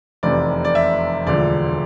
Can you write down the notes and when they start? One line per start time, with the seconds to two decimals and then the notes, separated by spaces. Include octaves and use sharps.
0.23 F1 E2 C3 D5
0.65 D5
0.75 E5
1.26 E1 D2 D3 F3 D5